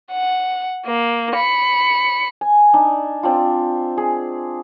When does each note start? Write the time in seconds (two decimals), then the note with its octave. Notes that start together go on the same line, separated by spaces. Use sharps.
0.12 F#5
0.86 A#3
1.35 B5 C#7
2.41 G#5
2.74 D4 D#4
3.23 C4 D4 F4
3.97 G#4